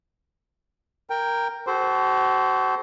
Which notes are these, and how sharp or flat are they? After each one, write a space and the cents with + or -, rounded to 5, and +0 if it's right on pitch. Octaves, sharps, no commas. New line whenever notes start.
A#4 +0 G5 +10
F#4 +35 A4 -25 C5 +0